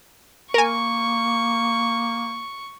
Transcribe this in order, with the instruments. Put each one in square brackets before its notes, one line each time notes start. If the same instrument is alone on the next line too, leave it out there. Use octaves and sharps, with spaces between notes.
[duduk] A#3 [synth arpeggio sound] A#4 G#5 [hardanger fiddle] C#6